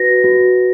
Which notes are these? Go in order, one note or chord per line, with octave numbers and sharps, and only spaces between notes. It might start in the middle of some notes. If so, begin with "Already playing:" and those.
Already playing: F#4 B4 A#6
F#4